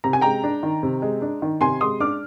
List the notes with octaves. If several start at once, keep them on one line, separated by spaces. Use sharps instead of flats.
C3 A#5
G#5
G#3 G5 A#5
D4
D#3
C3
G#3
D4
D#3
C3 G#5 C6
G#3 C6 D#6
D4 D6 F6